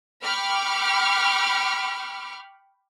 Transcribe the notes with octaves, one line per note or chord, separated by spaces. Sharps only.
G5 B5 C#6 D6 F6